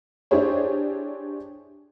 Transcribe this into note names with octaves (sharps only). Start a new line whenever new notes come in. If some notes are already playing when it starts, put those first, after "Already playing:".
D4 E4 G4 G#4 C5 C#5